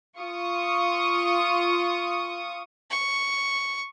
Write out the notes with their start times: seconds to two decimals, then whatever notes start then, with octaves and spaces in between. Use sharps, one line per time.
0.18 F4 C#6 D#6
2.91 C#6